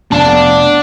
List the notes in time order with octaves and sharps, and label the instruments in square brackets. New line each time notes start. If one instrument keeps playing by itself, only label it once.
[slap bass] F1 F2 [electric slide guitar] B3 F5 A5 [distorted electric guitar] D4